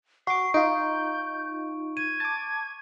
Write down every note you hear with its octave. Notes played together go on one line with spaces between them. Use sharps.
F#4 C#6 D6 C7
D#4 F4 G6 D7
G#6 D#7
A5 D6